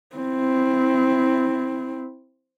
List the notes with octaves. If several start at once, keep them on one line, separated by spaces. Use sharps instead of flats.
C4 E4